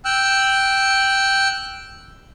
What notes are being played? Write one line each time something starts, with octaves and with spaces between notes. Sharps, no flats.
G5 E6 F#6